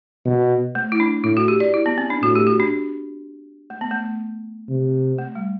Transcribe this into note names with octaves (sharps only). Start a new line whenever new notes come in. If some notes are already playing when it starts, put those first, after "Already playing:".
B2
A3
E4
D4
A2 E4
F#4
G4
D5
E4
B3
C4
D4
A2 F#4
G4
F#4
D4
A3
B3
A3
C3
A3
G3